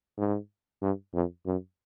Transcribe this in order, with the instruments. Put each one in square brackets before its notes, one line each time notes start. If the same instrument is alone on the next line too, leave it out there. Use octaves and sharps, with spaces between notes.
[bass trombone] G#2
G2
F2
F#2